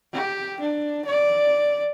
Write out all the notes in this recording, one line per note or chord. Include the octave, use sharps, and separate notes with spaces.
G4
D4
D5